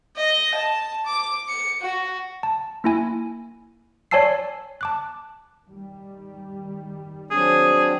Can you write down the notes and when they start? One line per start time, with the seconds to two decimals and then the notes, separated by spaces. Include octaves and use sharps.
0.16 D#5
0.55 A5
1.07 D6
1.49 C#7
1.81 F#4
2.43 A5
2.84 A#3 E4 G#5
4.11 C#5 D5 G#5 A5 E6 C7
4.81 A5 D6 F#6
5.68 D#3 G3
7.31 F#3 C4 D4 G#4